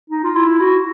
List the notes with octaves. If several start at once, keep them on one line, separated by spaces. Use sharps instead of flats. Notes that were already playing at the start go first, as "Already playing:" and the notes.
D#4
F4
E4
F#4